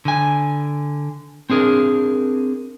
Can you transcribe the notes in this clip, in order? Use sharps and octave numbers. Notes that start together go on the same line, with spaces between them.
D3 G#5
C4 D4 G#4 A#4